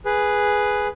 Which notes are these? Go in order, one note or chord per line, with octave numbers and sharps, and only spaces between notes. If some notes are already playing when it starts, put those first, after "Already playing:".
G#4 B4